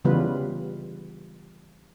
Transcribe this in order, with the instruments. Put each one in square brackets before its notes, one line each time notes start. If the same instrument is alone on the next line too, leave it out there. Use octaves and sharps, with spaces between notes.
[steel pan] C#3 E3 G3 B3 F4 B4